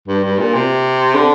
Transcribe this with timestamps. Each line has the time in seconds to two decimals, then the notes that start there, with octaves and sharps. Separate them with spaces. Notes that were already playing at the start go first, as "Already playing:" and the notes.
0.08 G2
0.24 G2
0.39 A#2
0.54 C3
1.15 D3